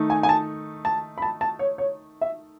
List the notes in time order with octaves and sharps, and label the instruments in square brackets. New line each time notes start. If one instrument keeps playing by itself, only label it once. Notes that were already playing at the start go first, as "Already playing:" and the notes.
Already playing: [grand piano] D#3 A3 D#4
[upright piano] G#5
G#5
A5
A5
B5
A5
A5
C#5
C#5
E5